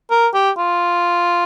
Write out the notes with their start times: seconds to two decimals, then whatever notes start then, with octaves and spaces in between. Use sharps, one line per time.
0.11 A#4
0.34 G4
0.57 F4